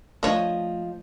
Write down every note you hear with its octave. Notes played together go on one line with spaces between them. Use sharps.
F3 A3 D4 C#5 D#5